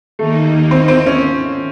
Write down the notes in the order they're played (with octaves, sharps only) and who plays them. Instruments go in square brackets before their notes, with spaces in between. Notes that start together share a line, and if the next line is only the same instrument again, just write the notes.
[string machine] D#2 D#3 A#3 D#4 [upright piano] A3
[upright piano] C4
C4
C#4